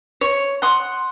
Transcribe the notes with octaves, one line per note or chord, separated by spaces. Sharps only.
C#5
F#5 C6 D#6